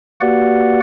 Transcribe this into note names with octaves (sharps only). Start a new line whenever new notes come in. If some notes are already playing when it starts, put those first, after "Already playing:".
A#3 F#4 G4 B4 D5 F#5